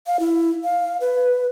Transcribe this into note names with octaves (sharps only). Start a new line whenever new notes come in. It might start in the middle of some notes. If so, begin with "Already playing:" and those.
F5
E4
F5
B4